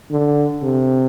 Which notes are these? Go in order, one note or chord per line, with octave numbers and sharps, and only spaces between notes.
D3
C3